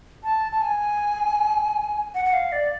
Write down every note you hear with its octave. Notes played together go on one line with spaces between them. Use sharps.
A5
A5
G#5
F#5
F#5
F5
D5